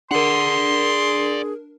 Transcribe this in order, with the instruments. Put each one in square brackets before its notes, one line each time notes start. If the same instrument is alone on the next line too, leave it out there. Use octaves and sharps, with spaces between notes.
[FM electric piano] D4 A#4 [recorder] G#4 [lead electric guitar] D5 F#5 [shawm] C6